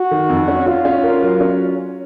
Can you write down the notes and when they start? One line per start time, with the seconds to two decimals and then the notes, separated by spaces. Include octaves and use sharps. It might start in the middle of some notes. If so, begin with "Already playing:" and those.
Already playing: F#4
0.11 D#3
0.29 F2
0.48 C#4
0.66 C#4 F4
0.85 C#4
1.04 A#4
1.22 F#3
1.40 C#4